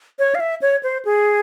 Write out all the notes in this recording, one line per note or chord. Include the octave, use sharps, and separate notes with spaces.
C#5
F5
E5
C#5
C5
G#4